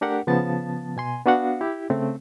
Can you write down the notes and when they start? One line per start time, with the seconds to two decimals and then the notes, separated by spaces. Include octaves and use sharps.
0.01 A3 D4 G4 A#4 F#5
0.27 C#3 F3 B3 A5 A6
0.97 B2 G#5 C6
1.26 B3 D4 F#4 F5 F#5
1.61 E4 G4
1.90 C#3 A3 C4